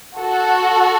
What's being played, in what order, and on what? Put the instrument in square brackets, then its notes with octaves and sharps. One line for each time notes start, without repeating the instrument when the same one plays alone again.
[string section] F#4 A4